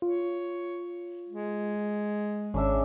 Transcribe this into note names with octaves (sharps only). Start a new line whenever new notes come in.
F4 C#5
G#3
G#1 C#3 D4 E5